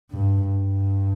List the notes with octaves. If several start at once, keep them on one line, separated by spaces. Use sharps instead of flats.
G2
G2